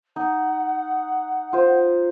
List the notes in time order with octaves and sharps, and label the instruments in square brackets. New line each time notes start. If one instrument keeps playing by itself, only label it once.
[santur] D#4 [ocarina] F#5
[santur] F4 C5